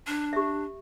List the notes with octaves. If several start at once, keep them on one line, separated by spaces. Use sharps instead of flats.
D4
G4 E5